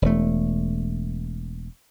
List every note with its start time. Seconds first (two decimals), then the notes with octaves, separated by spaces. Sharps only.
0.02 E1 A3